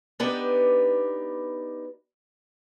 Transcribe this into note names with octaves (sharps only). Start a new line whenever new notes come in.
B3 D4 D#4 G4 B4